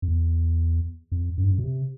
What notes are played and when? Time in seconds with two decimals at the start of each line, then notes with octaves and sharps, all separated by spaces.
0.02 F2
0.08 E2
1.12 F2
1.38 F#2
1.44 G2
1.51 F#2
1.58 B2
1.63 C3